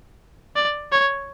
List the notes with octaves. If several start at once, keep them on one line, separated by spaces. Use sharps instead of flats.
D5
C#5